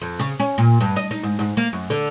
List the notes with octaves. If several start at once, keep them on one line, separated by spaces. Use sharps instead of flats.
F2
C#3
C#4
A#2
G2
D#5
D#4
G#2
G#2
A#3
F#2
D3